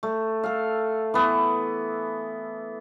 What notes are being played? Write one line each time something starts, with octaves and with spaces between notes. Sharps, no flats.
A3
A4 F5
E3 B3